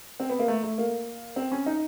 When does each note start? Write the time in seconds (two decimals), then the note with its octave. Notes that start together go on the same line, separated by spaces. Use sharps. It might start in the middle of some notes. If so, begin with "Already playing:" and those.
0.20 C4
0.30 B3
0.39 A#3
0.48 A3
0.63 A3
0.78 A#3
1.36 C4
1.52 C#4
1.66 D#4